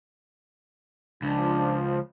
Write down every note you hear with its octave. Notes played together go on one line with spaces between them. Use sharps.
C#2 F3 D4